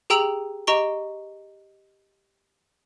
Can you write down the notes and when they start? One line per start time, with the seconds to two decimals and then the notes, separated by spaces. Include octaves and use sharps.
0.10 G4 G#4 G5 A#5 E6 F#7
0.67 G4 D#5 A#5 C#6 D7 G7